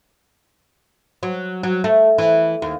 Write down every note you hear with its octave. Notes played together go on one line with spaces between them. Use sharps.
F#3
F#3
A3
E3
D#2